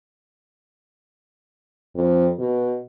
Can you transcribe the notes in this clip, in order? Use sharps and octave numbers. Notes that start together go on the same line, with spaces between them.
F2
B2